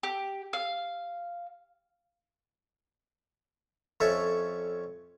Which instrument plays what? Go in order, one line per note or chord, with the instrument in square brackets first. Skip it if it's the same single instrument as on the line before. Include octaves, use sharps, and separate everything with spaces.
[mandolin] G4
F5
[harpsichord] F2 C#4 A4 C#5 E5